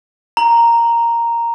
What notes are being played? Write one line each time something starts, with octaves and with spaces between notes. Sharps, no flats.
A#5